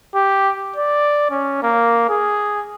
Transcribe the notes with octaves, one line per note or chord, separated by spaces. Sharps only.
G4
D5
C#4
A#3
G#4